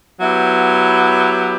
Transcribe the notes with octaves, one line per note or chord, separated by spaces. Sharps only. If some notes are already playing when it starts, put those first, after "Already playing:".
F#3 B3 E4 G4